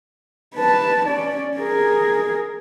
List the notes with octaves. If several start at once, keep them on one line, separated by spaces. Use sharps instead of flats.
B4 A5
C#4 D5
G#4 A#4